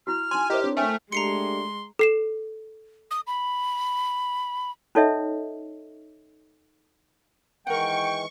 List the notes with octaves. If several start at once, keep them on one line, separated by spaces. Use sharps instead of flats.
E4 F#4 F6
D#4 G#5 C6
E4 G4 A#4 C5 D#5 E5
C4 D4 C#5
A3 G5 G#5 F6
G#3 A3 D4 G4 A#5 C6 C7 C#7
A4 C7 E7
D#6
B5
C#4 D#4 A4 C#5 D#5 E5
D#3 E3 G#3 A#4 F#5 G5 C#6